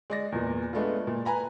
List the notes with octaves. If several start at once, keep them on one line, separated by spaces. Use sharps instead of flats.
G#3 D5 A#6
E2 A#2
G#3 A3 B3 D4 F4
A#2
B4 G#5 A#5 B5